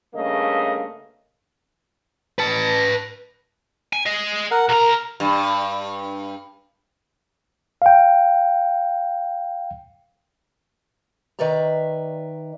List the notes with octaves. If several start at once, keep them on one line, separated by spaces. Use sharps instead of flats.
G2 C#3 A3 A#3 D#5
B4 A5
G#5
G#4 D#5
A#4 F#5
B1 A#4 A#5
G2
F5 G5
D#3 B4 D5 E5 A#5